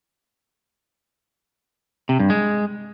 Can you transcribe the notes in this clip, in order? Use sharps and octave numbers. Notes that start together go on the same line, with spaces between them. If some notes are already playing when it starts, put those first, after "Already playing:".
C3
G2
G#3